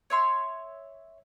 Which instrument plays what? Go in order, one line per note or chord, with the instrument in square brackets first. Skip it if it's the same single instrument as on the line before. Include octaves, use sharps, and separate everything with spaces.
[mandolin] C#5 E5 C6